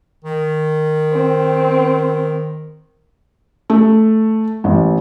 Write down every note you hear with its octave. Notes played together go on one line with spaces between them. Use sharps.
D#3
C4
A3
A1